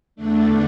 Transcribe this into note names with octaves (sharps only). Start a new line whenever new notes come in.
E2 D3 A3 D4